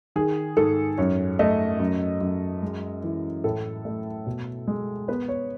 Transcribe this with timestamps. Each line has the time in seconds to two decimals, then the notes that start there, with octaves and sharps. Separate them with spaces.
0.16 D#3 G#4
0.57 G#2 A4
0.98 F#2 C#5
1.39 A3 D#5
1.80 F#2
2.21 F#2
2.62 G#3
3.04 E3
3.44 A2 A4
3.85 A3
4.26 B2
4.67 G#3
5.08 B3 B4
5.28 C#5